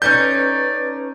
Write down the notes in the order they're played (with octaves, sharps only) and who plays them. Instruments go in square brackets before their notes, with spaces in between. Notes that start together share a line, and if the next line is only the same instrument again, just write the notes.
[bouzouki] C#4 D#4 A4 [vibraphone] B4 C#6 [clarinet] D5 [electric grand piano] G6